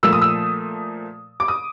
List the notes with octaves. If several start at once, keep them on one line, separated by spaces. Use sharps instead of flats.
A#2 F3 A3 E6
D#6
E6
D6
D#6